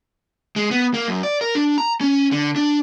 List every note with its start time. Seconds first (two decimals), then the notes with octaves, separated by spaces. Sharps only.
0.56 G#3
0.71 B3
0.94 A#3
1.08 F#2
1.23 D5
1.41 A#4
1.55 D4
1.78 A#5
2.01 C#4
2.31 D3
2.56 D4